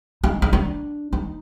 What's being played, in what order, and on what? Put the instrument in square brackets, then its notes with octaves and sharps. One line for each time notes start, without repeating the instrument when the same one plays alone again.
[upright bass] D#4
D#4
D4
D#4